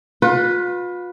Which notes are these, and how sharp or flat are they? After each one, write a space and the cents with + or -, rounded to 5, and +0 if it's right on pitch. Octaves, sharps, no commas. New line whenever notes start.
F4 +35 B4 +0